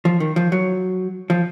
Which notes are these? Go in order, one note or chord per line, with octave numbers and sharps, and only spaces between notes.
F3
D#3
F3
F#3
F3